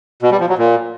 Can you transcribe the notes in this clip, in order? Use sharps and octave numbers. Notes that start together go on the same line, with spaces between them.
B2
G3
F3
F#3
A#2